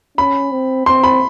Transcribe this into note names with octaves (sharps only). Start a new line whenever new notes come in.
C#4 B5
C4
C4 C6
B5